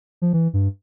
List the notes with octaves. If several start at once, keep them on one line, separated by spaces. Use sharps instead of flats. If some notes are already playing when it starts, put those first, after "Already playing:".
F3
E3
G2